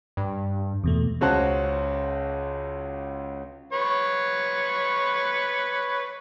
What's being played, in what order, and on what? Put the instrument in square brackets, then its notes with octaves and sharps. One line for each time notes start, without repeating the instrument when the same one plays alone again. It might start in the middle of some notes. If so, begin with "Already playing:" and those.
[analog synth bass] G2
[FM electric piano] E2 B2 A3
[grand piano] C#2 C#4 F#4 C5 A5 F#6
[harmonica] B4 C#5